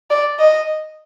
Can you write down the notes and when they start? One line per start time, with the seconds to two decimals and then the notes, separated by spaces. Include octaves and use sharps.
0.10 D5
0.39 D#5